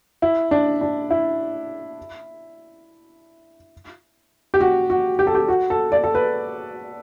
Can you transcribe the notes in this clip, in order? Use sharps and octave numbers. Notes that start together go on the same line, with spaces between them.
E4
D4
D4
E4
G4
F#4
F#4
G4
A4
G4
F#4
A4
D5
A4
B4